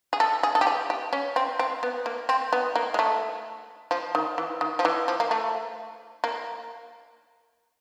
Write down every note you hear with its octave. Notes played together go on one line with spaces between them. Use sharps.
G#4
A4
G#4
A4
G4
G#4
G4
C#4
C4
C4
B3
A#3
C4
B3
A#3
G#3
A3
F3
D#3
E3
D#3
F3
E3
F3
A#3
A3
A#3